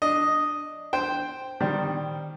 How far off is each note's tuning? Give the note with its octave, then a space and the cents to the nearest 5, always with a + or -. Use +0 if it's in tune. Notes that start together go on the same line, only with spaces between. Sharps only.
D4 +10 D#5 +0
C5 +0 G5 +0
D#3 -10 G3 +0 C5 +0